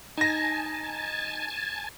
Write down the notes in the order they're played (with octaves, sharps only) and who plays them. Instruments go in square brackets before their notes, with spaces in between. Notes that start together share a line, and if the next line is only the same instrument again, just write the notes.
[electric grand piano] D#4 A#6 [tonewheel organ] G#5 A5